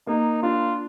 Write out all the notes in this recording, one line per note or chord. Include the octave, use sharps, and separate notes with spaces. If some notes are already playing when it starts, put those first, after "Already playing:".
A#3 D#4
D4 F4